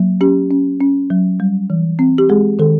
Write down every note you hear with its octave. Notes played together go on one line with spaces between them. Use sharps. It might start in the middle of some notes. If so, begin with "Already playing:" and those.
Already playing: F#3 A#3
C#4 G4
C#4
C#4
F#3
G3
E3
C4
G4
G#3 G#4
D#3 A4